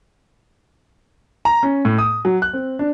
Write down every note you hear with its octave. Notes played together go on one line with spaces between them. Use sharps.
A#5
C#4
A2
D#6
F#3
F#6
C4
D4